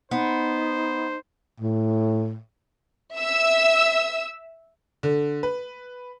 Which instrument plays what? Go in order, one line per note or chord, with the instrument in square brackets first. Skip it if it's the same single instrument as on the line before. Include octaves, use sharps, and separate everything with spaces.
[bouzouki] B3 [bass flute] D#4 [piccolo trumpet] C5
[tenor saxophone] A2
[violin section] E5 E6
[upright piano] D3
B4